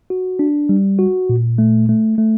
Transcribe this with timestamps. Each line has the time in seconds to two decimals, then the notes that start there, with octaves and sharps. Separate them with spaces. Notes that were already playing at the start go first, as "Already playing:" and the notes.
0.10 F#4
0.39 D4
0.69 G3
0.99 F#4
1.29 A#2
1.58 A3
1.89 A3
2.18 A3